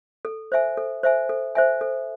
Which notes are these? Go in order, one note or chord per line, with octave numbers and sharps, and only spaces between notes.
A4
C5 E5 G#5
A4
C5 E5 G#5
A4
C5 E5 G#5
A4